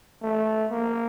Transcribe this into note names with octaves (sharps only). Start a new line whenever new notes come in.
A3
A#3